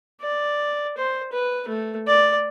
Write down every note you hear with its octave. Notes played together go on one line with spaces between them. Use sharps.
D5
C5
B4
A3
D5